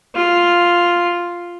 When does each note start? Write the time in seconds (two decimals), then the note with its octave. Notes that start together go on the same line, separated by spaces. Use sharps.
0.16 F4